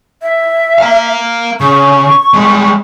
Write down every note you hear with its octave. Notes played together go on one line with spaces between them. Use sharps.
E5
F5 A#5
C#3 C#6
G3 G#3